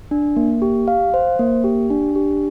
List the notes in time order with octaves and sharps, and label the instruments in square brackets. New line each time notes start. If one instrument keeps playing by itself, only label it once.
[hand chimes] D4
A#3
G4
F5
C5
A#3
G4
D4
G4